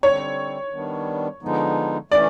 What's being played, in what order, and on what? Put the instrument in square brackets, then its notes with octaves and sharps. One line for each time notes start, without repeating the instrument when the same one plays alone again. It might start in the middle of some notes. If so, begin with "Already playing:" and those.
[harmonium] D3 G3 C4 [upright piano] C#5
[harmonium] D#3 G3 B3 D4
D3 F3 G#3 B3 D#4
[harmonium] E3 A3 C#4 [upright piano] D5